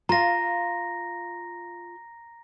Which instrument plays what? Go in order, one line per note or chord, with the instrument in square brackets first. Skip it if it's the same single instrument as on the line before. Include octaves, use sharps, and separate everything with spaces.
[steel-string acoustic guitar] F4 F5 [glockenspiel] A#5 A#6